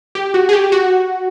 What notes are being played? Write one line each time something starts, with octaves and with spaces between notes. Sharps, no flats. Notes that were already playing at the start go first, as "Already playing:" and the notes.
G4
F#4
G#4
G4
F#4